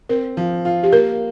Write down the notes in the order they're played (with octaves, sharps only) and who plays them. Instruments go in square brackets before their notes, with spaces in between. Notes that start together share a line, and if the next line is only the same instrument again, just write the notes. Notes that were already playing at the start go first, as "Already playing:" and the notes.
[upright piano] C4 [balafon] A#4
[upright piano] F3
F4
[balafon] G4
[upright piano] A#3 [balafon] A#4